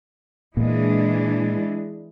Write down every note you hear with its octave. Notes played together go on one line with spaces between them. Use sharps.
A#2 E3 G#3 D4